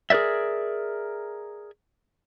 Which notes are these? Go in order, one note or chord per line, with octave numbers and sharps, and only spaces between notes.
G#4 A#4 B4 D5 E5